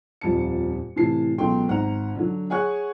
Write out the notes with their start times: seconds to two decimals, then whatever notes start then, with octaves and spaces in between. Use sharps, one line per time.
0.21 D#1 F2 F4 A5 C#7
0.96 A2 C3 E3 A5 C7
1.38 C#2 B2 F#3 A4 G5 C6
1.68 G#1 F#5 A#5 F7
2.15 D3 F#3
2.50 G#4 C#5 F#5 G#5 C#6 F#6